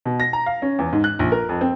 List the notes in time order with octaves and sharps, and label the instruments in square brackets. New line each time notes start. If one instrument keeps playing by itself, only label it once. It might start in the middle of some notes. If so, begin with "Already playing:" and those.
[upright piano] B2
A#6
A#5
F5
C#4
E2
G#2
F#6
A#1
A#4
F2
C4